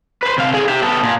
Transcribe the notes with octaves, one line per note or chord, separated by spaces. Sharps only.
B4 C5
C3 F5
D3 G#4
G4 E5
B3 A4
A#2